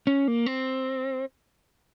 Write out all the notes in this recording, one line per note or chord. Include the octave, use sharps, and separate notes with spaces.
C#4
A#3
C4